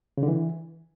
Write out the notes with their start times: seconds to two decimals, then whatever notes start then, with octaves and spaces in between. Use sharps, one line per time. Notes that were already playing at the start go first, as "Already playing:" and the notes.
0.17 C#3
0.23 D3
0.28 E3